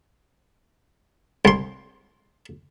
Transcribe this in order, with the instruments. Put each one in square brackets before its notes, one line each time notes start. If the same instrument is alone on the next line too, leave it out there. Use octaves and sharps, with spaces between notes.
[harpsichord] C2 C6